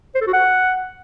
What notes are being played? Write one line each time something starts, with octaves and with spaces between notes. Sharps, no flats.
C5
A4
F#4
F#5